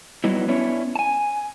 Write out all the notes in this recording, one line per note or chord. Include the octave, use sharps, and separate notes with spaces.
F#3 G3 B3 D#4 E4
B3 C#4 D4 E4 C#5
G#5 A5